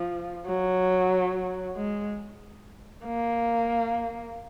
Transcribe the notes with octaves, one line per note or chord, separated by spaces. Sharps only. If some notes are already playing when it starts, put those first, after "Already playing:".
Already playing: F3
F#3
G#3
A#3